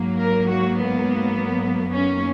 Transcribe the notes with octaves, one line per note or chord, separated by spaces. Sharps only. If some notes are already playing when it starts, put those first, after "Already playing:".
Already playing: G#2 F#3 A#3
A#4
F#4
B3
F#2 D#3 F#3 A#3 C#4